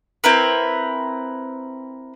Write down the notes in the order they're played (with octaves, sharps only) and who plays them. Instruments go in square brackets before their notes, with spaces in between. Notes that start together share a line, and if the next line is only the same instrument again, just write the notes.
[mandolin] C4 E4 A#4 B4